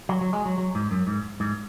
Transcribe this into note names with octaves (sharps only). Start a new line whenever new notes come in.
F#3
F#3
G#3
F#3
F#3
G#2
F#2
G#2
G#2